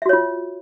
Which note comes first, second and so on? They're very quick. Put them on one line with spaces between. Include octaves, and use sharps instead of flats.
E5 F#4 C#5 F4